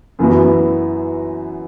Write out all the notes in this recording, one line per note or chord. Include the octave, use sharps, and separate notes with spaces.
F#2 E3 B3 F#4